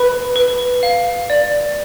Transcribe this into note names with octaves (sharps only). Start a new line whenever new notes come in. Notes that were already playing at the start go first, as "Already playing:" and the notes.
Already playing: B4 B5
B4
F5
D5